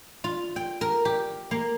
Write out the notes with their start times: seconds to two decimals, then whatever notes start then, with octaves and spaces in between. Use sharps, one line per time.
0.24 F4
0.56 G5
0.81 A#4
1.05 G4
1.51 A#3